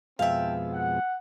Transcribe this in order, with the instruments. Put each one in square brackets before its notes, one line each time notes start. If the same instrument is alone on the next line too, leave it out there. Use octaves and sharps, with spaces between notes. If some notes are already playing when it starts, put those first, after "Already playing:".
[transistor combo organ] F2 B2 G#3 [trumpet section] C4 G5 A5 [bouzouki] E5 F5
[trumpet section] F#5